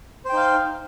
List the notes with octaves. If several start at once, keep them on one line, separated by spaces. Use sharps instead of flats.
D#4 C5 F5 G5